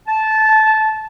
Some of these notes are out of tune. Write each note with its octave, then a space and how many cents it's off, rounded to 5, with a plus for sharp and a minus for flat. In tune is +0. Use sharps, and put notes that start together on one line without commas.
A5 -15